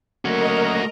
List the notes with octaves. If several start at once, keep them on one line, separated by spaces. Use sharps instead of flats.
F#3 A3 A#3 C#4 F#4 A#4 D#5 A#5